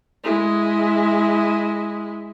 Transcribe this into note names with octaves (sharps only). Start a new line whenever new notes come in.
G#3 E4